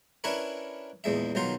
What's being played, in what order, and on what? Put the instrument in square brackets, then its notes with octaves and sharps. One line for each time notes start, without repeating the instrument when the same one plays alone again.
[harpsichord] C#4 D4 E4 A#4 B4 C#5
A#1 E2 G#3 E5
B1 D#3 F#3 F4 C6